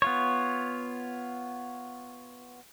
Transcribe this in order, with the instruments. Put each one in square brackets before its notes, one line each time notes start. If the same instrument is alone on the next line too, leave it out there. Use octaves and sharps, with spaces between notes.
[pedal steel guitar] B3 F4 C#5